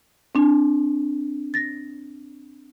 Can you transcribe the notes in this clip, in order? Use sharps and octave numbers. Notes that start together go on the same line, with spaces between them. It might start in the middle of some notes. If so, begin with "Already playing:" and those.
C4 D4
A6 A#6